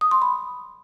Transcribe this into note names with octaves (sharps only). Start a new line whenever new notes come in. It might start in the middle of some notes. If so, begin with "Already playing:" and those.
D#6
C6
B5